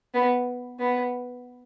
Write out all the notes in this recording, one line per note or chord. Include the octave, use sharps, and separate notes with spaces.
B3
B3